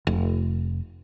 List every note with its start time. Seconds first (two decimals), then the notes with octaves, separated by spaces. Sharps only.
0.07 F1